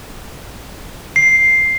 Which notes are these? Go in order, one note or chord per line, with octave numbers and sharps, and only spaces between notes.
C7